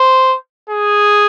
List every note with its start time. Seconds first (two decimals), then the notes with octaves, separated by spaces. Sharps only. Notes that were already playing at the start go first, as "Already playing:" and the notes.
Already playing: C5
0.70 G#4